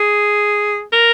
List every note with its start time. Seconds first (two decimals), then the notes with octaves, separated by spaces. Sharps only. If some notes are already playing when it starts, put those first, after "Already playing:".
Already playing: G#4
0.92 A#4